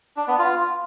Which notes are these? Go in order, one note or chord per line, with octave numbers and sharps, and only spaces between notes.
D4
B3
F4